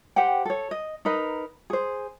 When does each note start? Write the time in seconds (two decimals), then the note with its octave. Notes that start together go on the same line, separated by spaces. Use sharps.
0.16 G4 C5 F#5 G5
0.45 A4 C#5
0.71 D#5
1.05 D#4 A#4 B4 D#5
1.70 G#4 C5